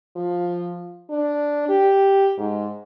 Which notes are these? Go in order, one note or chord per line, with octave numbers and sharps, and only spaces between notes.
F3
D4
G4
G#2